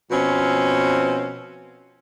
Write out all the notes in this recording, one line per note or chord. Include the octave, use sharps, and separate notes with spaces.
B2 F3 C4 C#4